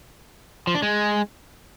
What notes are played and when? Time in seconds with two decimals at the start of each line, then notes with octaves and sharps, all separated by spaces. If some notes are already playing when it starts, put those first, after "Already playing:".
0.67 F3
0.75 D4
0.82 G#3